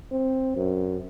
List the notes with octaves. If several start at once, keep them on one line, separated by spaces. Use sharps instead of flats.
C4
F#2